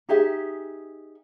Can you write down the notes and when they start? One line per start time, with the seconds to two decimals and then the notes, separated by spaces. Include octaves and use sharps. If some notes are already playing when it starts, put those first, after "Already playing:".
0.09 D#4 G4 G#4 E5